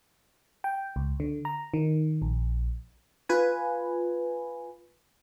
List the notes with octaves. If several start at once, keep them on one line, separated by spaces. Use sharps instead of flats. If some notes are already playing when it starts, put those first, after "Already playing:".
G5
C#2
D3
A#5
D#3
A#1
F4 B4 G#5